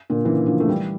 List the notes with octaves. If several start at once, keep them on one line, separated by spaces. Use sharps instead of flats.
A#2 D3
C#3 E3
D3 F3
A3
E3 G3